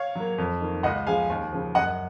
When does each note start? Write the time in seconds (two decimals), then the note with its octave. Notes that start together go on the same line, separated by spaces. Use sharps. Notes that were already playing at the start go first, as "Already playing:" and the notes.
Already playing: C#5 F5
0.15 F#3 A#3
0.38 F2
0.61 D#3 A#3
0.83 C#2 D#5 F#5
1.07 C#3 F3 G#3 F5 G#5
1.30 D#2
1.52 C#3 F3
1.75 F#2 D#5 F#5